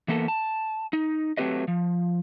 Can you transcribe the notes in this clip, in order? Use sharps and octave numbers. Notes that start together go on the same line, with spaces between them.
E3 A#3 B3 A4
A5
D#4
F#3 A3 C4 G4 B4 D#5
F3